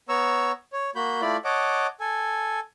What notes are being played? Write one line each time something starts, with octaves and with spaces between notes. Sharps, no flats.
B3 C#5 A#5 C#6 E6
C#5
A#3 F#4 B5 G6
A3 E4 F4 D5 B5
C#5 D#5 F#5 A5 D6
A4 G#5